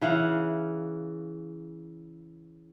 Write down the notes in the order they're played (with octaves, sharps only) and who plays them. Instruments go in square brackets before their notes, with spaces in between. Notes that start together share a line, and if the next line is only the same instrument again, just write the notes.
[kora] C#3 E3 F5 F#5